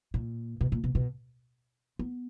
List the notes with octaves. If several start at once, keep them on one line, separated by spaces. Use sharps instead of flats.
A#2
B2
A#2
B2
B2
B3